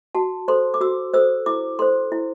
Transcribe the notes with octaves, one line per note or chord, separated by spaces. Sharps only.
F#4 A5
A4 C5 C6
D6
F#4 E6
A4 C5 E6
E4 D6
A4 C5 C6
E4